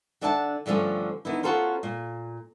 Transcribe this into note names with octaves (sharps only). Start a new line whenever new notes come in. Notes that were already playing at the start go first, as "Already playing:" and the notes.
D3 D4 E5 F#5 G5 A5
G2 D3 F3 A3 C#4
D#3 B3 D4 E4
C#4 F4 F#4 A4 A#4 C5
A#2